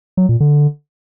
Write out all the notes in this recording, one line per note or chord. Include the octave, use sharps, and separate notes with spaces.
F#3
A#2
D3